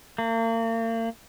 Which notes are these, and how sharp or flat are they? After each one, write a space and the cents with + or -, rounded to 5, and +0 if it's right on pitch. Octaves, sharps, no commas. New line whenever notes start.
A#3 -40